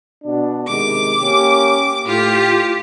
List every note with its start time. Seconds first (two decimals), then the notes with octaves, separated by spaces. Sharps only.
0.24 B2 D4
0.68 C3 D#3 G#3 D6
1.19 A#3 C#4 G4
2.06 A2 F4 G4